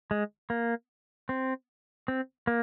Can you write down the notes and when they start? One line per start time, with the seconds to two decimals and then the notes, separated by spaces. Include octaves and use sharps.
0.11 G#3
0.50 A#3
1.29 C4
2.08 C4
2.47 A#3